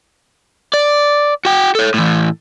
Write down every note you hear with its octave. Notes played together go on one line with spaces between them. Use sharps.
D5
F#4 G5
A4 C#5
A2 E3